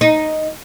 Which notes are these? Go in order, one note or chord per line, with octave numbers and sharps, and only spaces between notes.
D#4